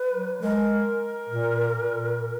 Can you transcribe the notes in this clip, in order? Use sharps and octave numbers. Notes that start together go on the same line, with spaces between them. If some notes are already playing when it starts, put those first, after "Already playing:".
Already playing: B4
F#3
G#3 A#4
A#2
A#2